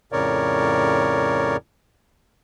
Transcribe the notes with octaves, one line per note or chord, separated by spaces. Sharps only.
F2 A2 C#3 A#4 C#5 D5